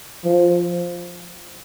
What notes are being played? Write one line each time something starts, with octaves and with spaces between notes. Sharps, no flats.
F3